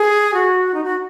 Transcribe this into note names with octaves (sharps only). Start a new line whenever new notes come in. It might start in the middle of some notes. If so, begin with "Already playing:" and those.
Already playing: G#4
F#4
D#4
F#4